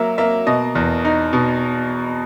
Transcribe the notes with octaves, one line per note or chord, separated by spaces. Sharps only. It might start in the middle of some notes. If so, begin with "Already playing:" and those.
Already playing: F#3 A#3 E5
A#3 E5
B2 D#5
E2
D#4
B2